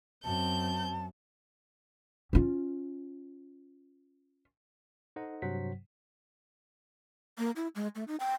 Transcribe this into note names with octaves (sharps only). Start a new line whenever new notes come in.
F#2 C4 A5 G6
C#4 F4
D#4 A4 C5 D#5 F#5
G2 C3 F#3 C5 F#5 B6
A#3
E4
G#3
A3
D#4
G5